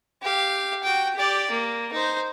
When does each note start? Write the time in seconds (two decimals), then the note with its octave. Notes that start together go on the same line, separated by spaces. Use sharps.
0.22 G4 F5
0.83 F#4 G5
1.15 G4 D5
1.51 A#3
1.93 D#4 C5